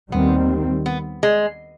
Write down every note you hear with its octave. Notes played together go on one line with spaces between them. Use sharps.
D#2 D#3 G3 B3 C4
B3
G#3